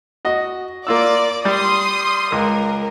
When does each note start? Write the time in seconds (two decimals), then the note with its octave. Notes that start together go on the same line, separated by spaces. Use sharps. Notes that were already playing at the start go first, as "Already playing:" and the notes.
0.25 F#4 D#5
0.87 A#3 F4 D5 E6
1.45 G3 C6 D#6
2.32 C#2 A#4